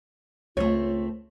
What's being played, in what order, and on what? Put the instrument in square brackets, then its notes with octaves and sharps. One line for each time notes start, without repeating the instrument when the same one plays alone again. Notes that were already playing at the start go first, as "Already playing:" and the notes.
[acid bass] C#2 [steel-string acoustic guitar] A3 C4 [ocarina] F4 [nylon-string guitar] C#5